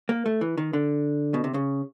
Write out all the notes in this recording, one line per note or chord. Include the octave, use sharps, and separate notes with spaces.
A#3
A3
E3
D#3
D3
B2
C3
C#3